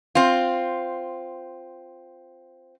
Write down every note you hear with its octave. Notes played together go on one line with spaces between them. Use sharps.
C4 F4